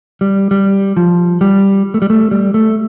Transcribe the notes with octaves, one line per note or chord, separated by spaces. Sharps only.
G3
G3
F3
G3
A3
G3
A3
G3
A3